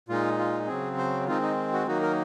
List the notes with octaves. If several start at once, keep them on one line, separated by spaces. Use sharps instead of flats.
A#2 G#3 D#4 F4
F4
C#3 F#3 C4 G#4
C5
D#3 G#3 C4 D#4 F4
D#4
F#4
D#3 F#3 A#3 D#4 F#4
A#4